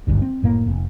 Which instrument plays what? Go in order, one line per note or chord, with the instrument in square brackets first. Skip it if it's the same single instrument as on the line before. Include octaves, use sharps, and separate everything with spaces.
[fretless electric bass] G#1 D2 G2
C4
F#1 A2 A#3
F1